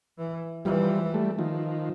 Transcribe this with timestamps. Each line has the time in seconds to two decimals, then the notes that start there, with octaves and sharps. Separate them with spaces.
0.18 E3
0.65 E3 F3 G3
1.14 G3 A3
1.39 D#3 F3